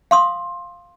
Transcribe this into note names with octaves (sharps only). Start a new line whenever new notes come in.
F5 C6 D#6